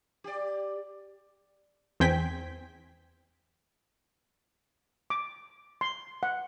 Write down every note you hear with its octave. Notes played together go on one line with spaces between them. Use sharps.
G4 D5
E2 C4 G5 G#5 B6
D6
C6
F#5